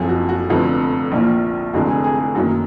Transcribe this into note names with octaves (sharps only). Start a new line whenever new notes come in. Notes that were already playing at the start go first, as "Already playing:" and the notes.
Already playing: F#1 F2 F3 G#4
F#4
F#4
F1 F2 D3 F3 B3 F#4
A#1 A#2 F3
F1 F2 D3 G#3 F#4
G#4
G#4
G#4
F#2 D#3 F#3 A#3 F#4